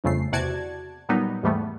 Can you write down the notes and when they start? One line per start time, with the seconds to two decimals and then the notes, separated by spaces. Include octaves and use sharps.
0.04 G1 F2 C#3 A3 C7
0.32 E2 C3 F#4 D5 A5 G#6
1.09 A#2 F#3 G3 B3 D#4
1.43 D#2 G#2 E3 G3 A3 B3